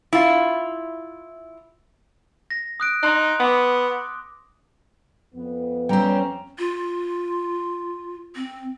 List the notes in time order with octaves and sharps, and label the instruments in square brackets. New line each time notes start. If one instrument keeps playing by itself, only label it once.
[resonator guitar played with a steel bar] E4 F4
[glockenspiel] A#6
D#6 F#6 D7
[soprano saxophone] D#4 [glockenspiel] C6 F#6
[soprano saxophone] B3 [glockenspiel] D6 D#6
[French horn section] F2 B3
[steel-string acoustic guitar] G3 C4 [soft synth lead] C#4 [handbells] G5 A#5
[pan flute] F4
C4